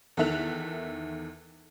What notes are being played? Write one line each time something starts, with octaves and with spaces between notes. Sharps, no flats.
E2 D#3 A4 E5 F#6 F7